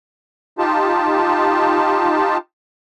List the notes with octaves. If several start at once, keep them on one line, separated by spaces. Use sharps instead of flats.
D#4 F4 G4 A5